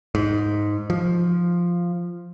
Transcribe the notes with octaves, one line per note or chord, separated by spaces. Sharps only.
G#2
F3